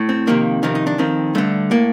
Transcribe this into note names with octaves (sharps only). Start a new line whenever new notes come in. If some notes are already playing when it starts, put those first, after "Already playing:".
Already playing: A2
C4
F2 C3 D#3 A#3
F2 C3 D#3 C4
D#4
D4
F2 D#3 C4
G2 D3 A3
A2 A#3